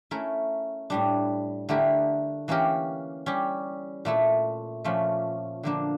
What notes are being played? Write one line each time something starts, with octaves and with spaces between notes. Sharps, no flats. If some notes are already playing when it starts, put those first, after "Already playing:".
A3 C#4 E4 A#4
A2 G3 D4
D3 A3 E4 G4 A#4
E3 A#3 C#4 G4 A#4
G3 C#4 G4
A#2 A3 E4 A4
A#2 F3 A3 C#4
D3 F3 A#3 D4